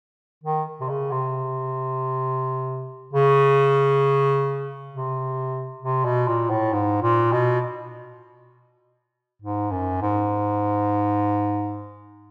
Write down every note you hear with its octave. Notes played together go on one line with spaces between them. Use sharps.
D#3
C3
C#3
C3
C#3
C3
C3
B2
A#2
A2
G#2
A#2
B2
G#2
F#2
G#2